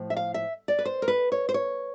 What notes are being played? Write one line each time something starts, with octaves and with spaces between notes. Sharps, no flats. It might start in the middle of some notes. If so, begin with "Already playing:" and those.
Already playing: A2 F3
E5
F5
E5
D5
B4
C5
A#4
B4
C#5
C5
C#5